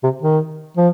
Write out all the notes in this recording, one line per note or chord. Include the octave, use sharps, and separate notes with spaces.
C3
D#3
F3